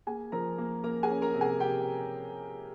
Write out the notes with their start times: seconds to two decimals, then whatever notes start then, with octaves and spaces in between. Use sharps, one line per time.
0.07 A#3 G#4 G#5
0.32 F3 A#4 A#5
0.58 A#3
0.84 A#3 A#4 A#5
1.03 G#4 G#5
1.09 C#4
1.22 A#4 A#5
1.34 C3
1.41 G#4 G#5
1.60 C3 G4 G5